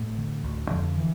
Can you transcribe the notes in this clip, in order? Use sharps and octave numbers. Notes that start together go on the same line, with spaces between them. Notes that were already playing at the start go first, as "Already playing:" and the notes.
Already playing: A2 A3
D3
D2
F2 D3 F3
E3